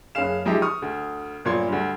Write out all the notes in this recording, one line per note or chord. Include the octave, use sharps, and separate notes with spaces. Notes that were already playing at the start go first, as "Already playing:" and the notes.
F#1 C#4 G#4 F5 E7
F3 G#3 D#4 G4 E5
C#6 D#6 F6
D2
G1 A#2 F4 C6 G#6
D2 G2